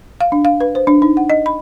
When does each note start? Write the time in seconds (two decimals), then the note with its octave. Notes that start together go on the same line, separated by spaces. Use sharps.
0.21 F5
0.32 D4
0.45 F5
0.60 B4
0.75 C5
0.87 D4
1.02 D#4
1.17 F#5
1.30 D#5
1.46 B5